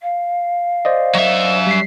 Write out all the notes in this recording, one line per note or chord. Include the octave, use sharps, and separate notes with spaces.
F5
C5 D5 D#5
F#3 E5
G3 B6 C7